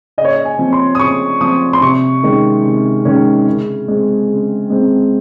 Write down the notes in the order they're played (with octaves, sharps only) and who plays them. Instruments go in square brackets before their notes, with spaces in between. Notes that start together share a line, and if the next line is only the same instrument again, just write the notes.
[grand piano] C#3 D#5
C#5
D#5
G#5
F3 C4
C6
D#6
C#3 C#6
F3 C4 D#6
C6
C3 C#6
D#3 G#3 C#4
C3
D#3 G#3 C#4
C#3
G#3 C4
C#3
G#3 C4